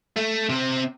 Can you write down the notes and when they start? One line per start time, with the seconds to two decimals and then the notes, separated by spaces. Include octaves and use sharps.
0.16 A3
0.49 C3 C4